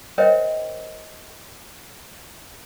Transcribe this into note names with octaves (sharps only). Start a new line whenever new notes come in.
A#4 C5 C#5 D#5 E5 G5